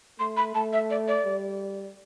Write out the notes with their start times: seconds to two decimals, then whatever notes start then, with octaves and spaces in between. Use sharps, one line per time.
0.19 A3 C6
0.37 B5
0.55 A3 A5
0.73 E5
0.90 D5
1.08 D5
1.26 G3